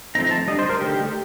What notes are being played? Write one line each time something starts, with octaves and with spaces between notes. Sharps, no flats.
F3 A3 C4 D#4 A#5
A5
G3 D4 D#5
C5
A#4
D3 A3 D#4 G4